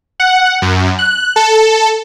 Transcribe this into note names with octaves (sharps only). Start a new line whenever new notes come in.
F#5
F#2
F#6
A4